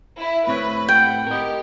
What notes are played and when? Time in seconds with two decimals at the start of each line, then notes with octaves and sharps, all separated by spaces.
0.17 E4 E5
0.47 A2 C4 B4 C#5 B5
0.89 F#5 G5
1.27 G4 A#4 D#5